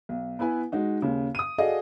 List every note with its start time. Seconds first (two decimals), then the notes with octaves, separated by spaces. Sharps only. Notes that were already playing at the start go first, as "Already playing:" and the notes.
0.09 B1
0.39 B3 E4 B4 G#5
0.72 G#3 D#4 F#4
1.02 D#2 C#3
1.35 D#6 D#7
1.58 F#4 G#4 A4 D5 D#5 F5